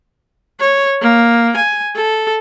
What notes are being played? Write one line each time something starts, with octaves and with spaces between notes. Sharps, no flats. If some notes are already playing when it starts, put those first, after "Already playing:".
C#5
A#3
G#5
A4